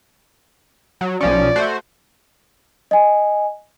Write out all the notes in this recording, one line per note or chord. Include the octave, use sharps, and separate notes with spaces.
F#3
B1 F3 C#4 D5
A3 F#4 C5
D#5 G#5